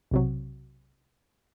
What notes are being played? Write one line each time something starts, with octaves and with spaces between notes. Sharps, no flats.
B1 C3 F#3